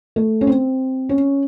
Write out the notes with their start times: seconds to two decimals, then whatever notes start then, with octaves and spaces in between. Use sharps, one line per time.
0.16 A3
0.41 C#4
0.47 C4
1.09 C#4